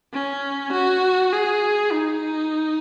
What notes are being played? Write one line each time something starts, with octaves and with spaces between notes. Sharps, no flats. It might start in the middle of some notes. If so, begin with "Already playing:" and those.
C#4
F#4
G#4
D#4